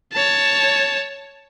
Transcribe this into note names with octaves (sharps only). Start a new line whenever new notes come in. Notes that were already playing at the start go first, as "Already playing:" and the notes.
C#5 A5